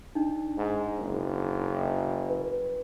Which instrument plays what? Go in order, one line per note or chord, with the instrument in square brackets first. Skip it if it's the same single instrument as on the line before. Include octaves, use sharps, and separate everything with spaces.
[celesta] D4 D#4
[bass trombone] G#2
F#1
[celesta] B4